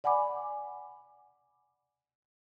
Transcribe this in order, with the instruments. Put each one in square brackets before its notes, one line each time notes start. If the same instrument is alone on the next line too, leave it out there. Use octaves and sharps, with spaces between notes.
[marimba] D5 F#5 G#5 B5 D6